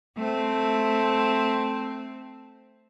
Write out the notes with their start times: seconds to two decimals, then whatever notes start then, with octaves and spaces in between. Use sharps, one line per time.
0.18 A3 C4